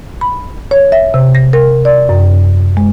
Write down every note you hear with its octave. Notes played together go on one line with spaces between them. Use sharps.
B5
C#5
E5
C3
A#6
A#4
D5
F#2
G#3